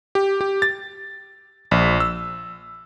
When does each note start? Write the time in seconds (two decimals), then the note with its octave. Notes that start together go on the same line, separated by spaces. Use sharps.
0.15 G4
0.41 G4
0.62 A6
1.71 A#1
2.00 E6